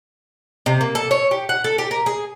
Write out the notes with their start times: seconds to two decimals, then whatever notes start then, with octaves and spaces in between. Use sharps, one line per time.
0.66 C3
0.81 A#3
0.95 A4
1.11 C#5
1.31 G4
1.49 F#5
1.64 A4
1.78 G4
1.91 A#4
2.06 G#4